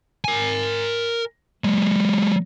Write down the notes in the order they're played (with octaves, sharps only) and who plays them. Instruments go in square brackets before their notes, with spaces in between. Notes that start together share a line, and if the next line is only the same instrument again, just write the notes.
[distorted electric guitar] A#4 G#5
F#3 G#3